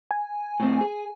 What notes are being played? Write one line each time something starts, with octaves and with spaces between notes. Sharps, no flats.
G#5
A2 C4
G#4